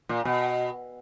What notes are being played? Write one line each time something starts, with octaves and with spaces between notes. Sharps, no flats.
A#2
B2